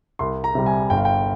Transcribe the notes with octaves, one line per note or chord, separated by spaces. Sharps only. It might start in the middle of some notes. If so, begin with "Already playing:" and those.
C2 C6
A#5
C3 G3
G#5
G1 G5
F5
G5